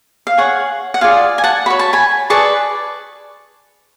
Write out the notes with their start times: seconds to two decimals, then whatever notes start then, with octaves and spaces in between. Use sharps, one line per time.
0.27 F5
0.37 G#4 C#5 F#5
0.94 F#5
1.01 F4 G#4 D5 F5 G#5
1.38 G#5
1.44 F#5 A5
1.66 F#4 C#5 B5
1.79 A5
1.93 G#5 B5
2.30 G#4 B4 D5 A5 C#6